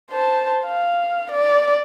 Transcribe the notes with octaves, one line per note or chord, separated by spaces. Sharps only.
C5 A5
F5
D5